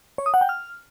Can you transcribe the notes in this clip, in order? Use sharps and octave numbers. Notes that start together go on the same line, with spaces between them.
C#5
D#6
F#5
G5
F6